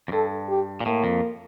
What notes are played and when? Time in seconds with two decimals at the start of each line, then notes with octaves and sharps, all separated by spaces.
0.08 F2
0.12 G2 A4
0.49 G4
0.80 A#2
0.86 A2 A#3
1.04 F2